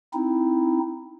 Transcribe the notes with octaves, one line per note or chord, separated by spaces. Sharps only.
C4 D#4 E4